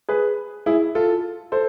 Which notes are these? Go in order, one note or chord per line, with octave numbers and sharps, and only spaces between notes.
G#4 B4
E4 G#4
F4 A4
A4 C5